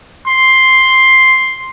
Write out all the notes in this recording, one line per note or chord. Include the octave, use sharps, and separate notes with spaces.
C6